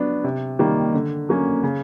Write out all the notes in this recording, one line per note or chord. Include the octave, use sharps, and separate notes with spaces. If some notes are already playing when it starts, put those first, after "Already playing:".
Already playing: F#3 B3 D4
C3
D#3 G3 A#3
D3
F#3 A#3 C#4
C#3